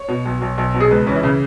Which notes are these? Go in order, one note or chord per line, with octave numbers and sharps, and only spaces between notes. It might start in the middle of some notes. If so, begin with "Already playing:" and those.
Already playing: C#5
B2
B1
B1
B1
B2
G#4
C#2 B4
E3 C#4
E4
C#3